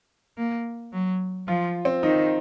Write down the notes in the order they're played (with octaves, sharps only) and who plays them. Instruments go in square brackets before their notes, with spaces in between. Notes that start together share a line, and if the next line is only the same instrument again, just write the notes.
[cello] A#3
F#3
[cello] F3 [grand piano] F4
[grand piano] C4
[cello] D#3 [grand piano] D#4